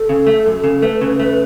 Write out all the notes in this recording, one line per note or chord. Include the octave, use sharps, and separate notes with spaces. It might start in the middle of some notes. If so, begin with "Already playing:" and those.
Already playing: A4
C#3
A3
F#2
C#3
A3 B4
C#3
A3